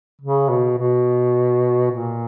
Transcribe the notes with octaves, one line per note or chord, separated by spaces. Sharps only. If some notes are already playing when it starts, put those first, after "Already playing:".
C#3
B2
B2
A#2